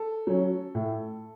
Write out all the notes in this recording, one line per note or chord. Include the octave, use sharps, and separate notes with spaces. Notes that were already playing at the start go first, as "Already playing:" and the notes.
Already playing: A4
F#3 C#4
A2